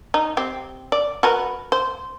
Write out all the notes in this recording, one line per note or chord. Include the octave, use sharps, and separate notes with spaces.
D#4
C4 G4
D5
F#4 A#4 B4
C5